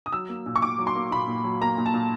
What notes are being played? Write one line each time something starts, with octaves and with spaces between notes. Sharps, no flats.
D#6
F#3 E6
A#3
A#2
C#6
A#2 D6
F#3
C6
A#3
A#2 B5
A#2
F#3
A#3 A#5
A#2
A5
A#2